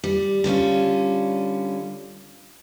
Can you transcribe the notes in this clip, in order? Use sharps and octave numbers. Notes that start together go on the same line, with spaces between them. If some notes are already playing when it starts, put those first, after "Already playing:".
G3
D3 G3 C#4 F4